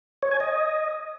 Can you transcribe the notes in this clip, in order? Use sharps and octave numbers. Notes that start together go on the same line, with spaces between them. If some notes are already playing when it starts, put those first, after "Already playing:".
C#5
G#5
D#5